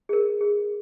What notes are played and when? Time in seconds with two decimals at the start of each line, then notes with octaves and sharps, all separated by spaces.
0.09 G#4
0.13 A#4
0.41 G#4